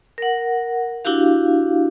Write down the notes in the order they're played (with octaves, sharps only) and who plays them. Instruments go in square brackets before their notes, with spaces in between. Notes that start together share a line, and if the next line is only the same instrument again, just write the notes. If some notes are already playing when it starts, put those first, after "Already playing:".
[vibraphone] A#4 F#5
D4 E4 F#4 G4 F5